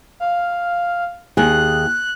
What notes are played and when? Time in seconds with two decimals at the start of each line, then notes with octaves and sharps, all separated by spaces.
0.20 F5
1.37 D#2 G#4 F#6